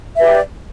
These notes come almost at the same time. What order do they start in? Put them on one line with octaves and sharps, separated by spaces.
E5 B4 G4 D5